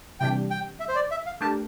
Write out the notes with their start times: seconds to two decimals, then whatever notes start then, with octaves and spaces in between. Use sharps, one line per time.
0.20 C3 E3 G3 D4 G4 G5
0.51 G5
0.80 E5
0.89 C5
0.96 D5
1.11 E5
1.26 F5
1.41 A3 D4 G4 A#4 A5